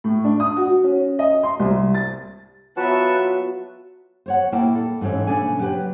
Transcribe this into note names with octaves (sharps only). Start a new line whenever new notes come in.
A2
D4
D#6
F#4
C#4
D#5
C6
C2
A6
F#3 B3 F4 B4 E5 F#5 A5
C5 C#5 F#5
A#2 A#3 E4 G5 A5
A4
G#2 E3 C4 C#4 A4
A#2 C#3 D4 A4 G#5
F#3 G4 B4